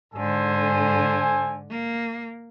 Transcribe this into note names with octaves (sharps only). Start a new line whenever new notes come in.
G#2 D3 A4 C5 G#5
A#3